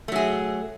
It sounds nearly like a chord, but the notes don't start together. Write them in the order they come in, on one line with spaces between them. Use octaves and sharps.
A3 F#3 G#4